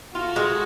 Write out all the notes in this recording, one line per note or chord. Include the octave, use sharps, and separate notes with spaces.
F4 F#4 A4
G#3